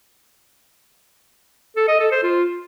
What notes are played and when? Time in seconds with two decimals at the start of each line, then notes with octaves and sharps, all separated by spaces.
1.76 A4
1.88 D#5
2.00 A4
2.12 C5
2.24 F4